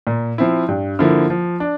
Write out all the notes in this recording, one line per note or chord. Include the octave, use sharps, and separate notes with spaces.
A#2
F3 C4 E4
G2
D3 F3 A#3 E4
F3
D4